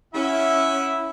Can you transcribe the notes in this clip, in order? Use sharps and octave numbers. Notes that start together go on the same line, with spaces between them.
C#4 E4 E5 F#5 B5